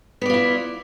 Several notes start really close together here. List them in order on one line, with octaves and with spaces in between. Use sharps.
B3 D5 F4 E4